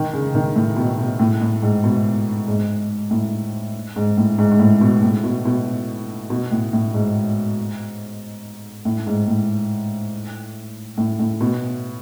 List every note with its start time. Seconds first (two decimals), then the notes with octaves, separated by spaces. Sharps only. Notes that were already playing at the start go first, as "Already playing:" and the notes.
Already playing: D#3
0.13 C#3
0.35 D#3
0.56 A2
0.77 B2
0.98 B2
1.20 A2
1.41 A2
1.62 G#2
1.84 B2
2.48 G#2
3.11 A2
3.96 G#2
4.17 A2
4.38 G#2
4.51 G#2
4.60 A2
4.81 B2
5.03 A2
5.24 B2
5.45 B2
6.30 B2
6.51 A2
6.73 A2
6.94 G#2
8.85 A2
9.07 G#2
9.28 A2
10.98 A2
11.19 A2
11.41 B2